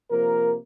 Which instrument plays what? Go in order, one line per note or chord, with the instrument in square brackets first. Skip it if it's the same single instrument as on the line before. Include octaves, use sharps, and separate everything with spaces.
[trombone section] C3 F3 A#3 A#4